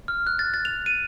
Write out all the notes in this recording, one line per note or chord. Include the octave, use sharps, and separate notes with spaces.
F6
F#6
A6
A6
F7
D#7